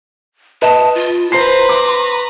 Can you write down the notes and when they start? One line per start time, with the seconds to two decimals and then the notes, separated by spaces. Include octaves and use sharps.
0.62 B4 D#5 A5
0.95 F4
1.32 B4 C5 A#5 C6 C7
1.69 D6